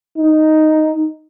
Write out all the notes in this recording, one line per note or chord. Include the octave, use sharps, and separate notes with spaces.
D#4